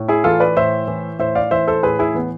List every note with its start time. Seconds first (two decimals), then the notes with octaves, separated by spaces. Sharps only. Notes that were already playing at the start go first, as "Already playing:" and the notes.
Already playing: A2
0.08 E4 G#4
0.24 E3 F4 A4
0.40 B4 D5
0.57 A2 C5 E5
0.88 E3
1.19 A2 C5 E5
1.35 D5 F5
1.51 E3 C5 E5
1.67 A4 C5
1.83 A2 G#4 B4
1.99 E4 G#4
2.14 E3 B3